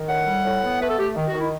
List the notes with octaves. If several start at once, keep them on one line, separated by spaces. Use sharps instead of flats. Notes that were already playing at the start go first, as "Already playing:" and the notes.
Already playing: D#3
A2 F#5
G3
A2
B3
A3 B4
A4
A3 G4
D#3
F#4
D#3
E4